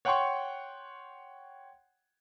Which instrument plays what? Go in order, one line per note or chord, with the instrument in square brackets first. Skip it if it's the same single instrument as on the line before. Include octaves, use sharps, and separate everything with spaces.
[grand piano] C#5 F#5 G5 C6 C#6